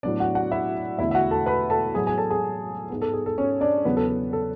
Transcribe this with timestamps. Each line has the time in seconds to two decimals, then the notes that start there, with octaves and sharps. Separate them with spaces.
0.03 A2 F#3 B3 D4 D5
0.20 F#4 F#5
0.35 F#4 F#5
0.51 E4 E5
0.98 E2 D3 A3 E4 E5
1.11 E5
1.15 F#4 F#5
1.31 A4 A5
1.46 B4 B5
1.70 A4 A5
1.95 A2 F#3 B3 G#4 G#5
2.07 G#4 G#5
2.18 A4 A5
2.30 G#4 G#5
2.90 G#2 G#3 B3
3.02 A4
3.13 G#4
3.26 A4
3.38 C#4 C#5
3.61 D4 D5
3.85 E2 C#3 F#3 B3 B4
3.97 A4
4.09 A4
4.33 A4